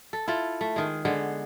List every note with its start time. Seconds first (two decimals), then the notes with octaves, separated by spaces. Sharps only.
0.13 A4
0.28 E4 F4 A4
0.61 A3
0.76 D#3 G#3
1.05 D3 G#3 B3